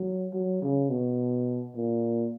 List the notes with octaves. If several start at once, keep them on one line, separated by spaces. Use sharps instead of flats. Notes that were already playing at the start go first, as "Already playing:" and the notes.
Already playing: F#3
F#3
C#3
B2
A#2